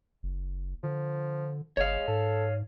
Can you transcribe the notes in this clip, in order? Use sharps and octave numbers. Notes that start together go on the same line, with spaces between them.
F#1
D3 F3
G1 G#3 C#5 F5
G#2 A4